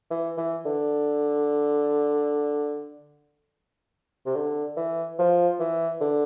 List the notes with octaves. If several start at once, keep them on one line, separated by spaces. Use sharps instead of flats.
E3
E3
D3
C3
D3
E3
F3
E3
D3